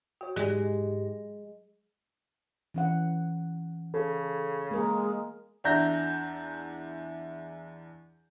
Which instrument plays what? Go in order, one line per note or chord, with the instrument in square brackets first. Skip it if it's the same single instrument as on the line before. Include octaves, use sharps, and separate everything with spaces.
[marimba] F#4 [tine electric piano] C#5 G5
[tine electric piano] G#2 G4 A#6 [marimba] F#3 D5 [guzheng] G#3
[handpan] E3 C#4 F#5
[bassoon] C#3 [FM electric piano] A4
[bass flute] G#3 [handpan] A#3 A#4
[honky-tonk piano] E2 D4 E5 A#5 G6 A#6